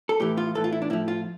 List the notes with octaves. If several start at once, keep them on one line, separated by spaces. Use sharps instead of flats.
A4
A2 E3 G4
F4
A2 E3 A4
F4
E4
D4
A2 F3 E4
F4